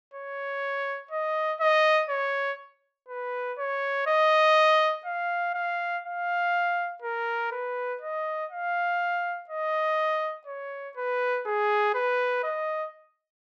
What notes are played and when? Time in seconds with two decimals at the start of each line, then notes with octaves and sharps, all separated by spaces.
0.14 C#5
1.11 D#5
1.60 D#5
2.10 C#5
3.09 B4
3.58 C#5
4.07 D#5
5.06 F5
5.54 F5
6.04 F5
7.02 A#4
7.52 B4
8.01 D#5
8.51 F5
9.49 D#5
10.47 C#5
10.97 B4
11.46 G#4
11.94 B4
12.43 D#5